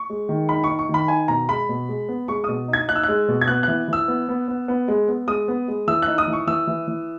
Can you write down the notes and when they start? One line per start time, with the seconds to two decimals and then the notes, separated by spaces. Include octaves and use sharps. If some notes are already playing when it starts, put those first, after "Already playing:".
Already playing: C#6
0.10 G#3
0.29 D#3
0.49 D#4 B5
0.64 C#6
0.69 D#4
0.79 C#6
0.89 D#3
0.94 B5
1.08 D#4 G#5
1.28 B2 A#5
1.49 G#3 B5
1.69 B2
1.89 G#3
2.08 B3
2.28 G#3 C#6
2.44 B2 D#6
2.68 D#4
2.73 G#6
2.88 D#4 F#6
2.96 E6
3.03 G#3 F#6
3.28 B2
3.41 G#6
3.48 B3 F#6
3.63 E3 F#6
3.88 E3 E6
4.08 B3
4.29 B3
4.48 B3
4.68 B3
4.88 G#3
5.08 B3
5.27 G#3 D#6
5.48 B3
5.68 G#3
5.87 E3 E6
6.02 F#6
6.08 D#4
6.18 D#6
6.28 E3
6.33 C#6
6.47 E3 E6
6.67 E3
6.88 E3